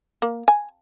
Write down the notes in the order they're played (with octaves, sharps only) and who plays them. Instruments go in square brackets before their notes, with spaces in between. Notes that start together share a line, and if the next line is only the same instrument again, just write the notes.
[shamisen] A#3
G#5